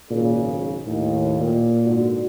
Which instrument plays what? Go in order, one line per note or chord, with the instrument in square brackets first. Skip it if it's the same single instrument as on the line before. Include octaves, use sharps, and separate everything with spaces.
[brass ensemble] G#1 C#3 G#4 [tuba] A#2
[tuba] B1
[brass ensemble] D#2 [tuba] A2
[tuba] A#2
[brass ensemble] G#2 D3 F#4